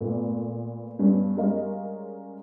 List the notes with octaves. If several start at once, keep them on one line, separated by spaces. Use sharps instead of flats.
A#2 A3 B3
G2 G3 B3 C#4
G3 G#3 C#4 A#4 D#5 F5